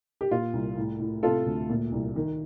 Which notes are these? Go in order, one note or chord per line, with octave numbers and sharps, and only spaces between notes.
G4
A#2 F4
C2
A2
A2
C3 F4 A4
D2
A#2
C2
D#3